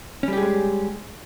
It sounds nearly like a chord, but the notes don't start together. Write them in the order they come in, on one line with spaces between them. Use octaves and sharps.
C#4 G3 G4 G#4 G#3